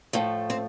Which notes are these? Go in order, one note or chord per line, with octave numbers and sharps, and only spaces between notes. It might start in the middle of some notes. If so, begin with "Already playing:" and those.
A2 F3 A3
C4